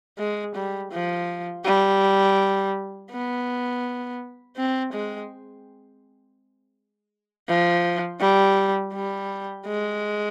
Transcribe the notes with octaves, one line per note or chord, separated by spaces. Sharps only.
G#3
G3
F3
G3
B3
C4
G#3
F3
G3
G3
G#3